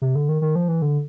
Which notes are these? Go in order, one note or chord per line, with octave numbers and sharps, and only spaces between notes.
C3
D3
D#3
D#3
F3
E3
D3